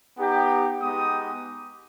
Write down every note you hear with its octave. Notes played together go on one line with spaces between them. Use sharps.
B3 D#4 G4
G#3 B3 D#4 G4 D#6